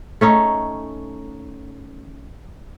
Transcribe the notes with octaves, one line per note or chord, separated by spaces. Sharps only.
A3 C#4 D#4